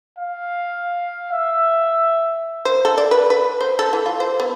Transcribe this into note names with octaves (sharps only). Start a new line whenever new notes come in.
F5
E5
C5
A4
D5
B4
B4
C5
A4
E3
F4
C5
B3